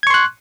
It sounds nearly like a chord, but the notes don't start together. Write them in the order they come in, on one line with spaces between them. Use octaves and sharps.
G#6 C#6 C6 F#6